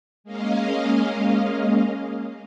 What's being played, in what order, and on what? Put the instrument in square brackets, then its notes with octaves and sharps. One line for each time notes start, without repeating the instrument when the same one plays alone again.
[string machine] G#3 A#3 C#4 D#5 F5